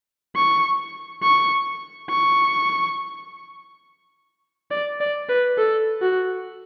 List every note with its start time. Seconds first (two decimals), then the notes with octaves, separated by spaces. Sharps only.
0.36 C#6
1.23 C#6
2.10 C#6
4.71 D5
5.00 D5
5.29 B4
5.58 A4
6.02 F#4